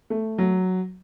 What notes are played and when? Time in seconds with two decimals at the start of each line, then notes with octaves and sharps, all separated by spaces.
0.10 A3
0.38 F#3